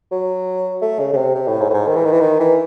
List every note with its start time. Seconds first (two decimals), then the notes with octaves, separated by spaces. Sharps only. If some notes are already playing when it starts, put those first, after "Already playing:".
0.11 F#3
0.82 A3
0.99 C#3
1.13 C#3
1.17 C3
1.34 C3
1.48 A2
1.61 G#2
1.70 A2
1.74 G#2
1.87 D#3
1.96 E3
2.04 D#3
2.12 E3
2.20 D#3
2.40 E3